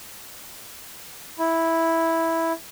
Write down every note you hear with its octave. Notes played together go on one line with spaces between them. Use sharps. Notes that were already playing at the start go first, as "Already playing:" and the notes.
E4